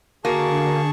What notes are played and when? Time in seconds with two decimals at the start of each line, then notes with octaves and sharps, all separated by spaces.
0.25 D3 A#3 F#4 G#4 A5 C#6